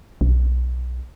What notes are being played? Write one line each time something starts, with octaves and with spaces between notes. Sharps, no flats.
B1